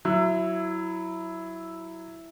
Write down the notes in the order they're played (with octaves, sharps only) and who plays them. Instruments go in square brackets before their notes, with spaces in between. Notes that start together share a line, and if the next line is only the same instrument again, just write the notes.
[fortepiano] F#3 [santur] E4